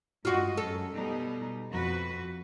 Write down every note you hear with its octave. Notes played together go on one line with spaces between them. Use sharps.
G2 G#3 F4 F#4 D#5
F#2 F#3 A4
B2 G3 D#4
F2 F#4 B4